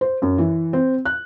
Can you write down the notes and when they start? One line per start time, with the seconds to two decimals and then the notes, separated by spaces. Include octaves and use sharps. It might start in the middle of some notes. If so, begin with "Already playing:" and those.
0.01 C5
0.22 F#2
0.38 E3
0.73 C4
1.05 F#6